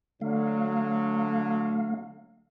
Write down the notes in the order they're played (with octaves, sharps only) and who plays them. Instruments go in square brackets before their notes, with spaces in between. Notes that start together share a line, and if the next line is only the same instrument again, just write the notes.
[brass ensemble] D3 F#3 [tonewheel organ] A3 F5